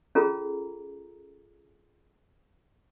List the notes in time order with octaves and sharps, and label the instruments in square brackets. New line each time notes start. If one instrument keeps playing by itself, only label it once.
[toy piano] C#4 F4 G#4 A4 A#5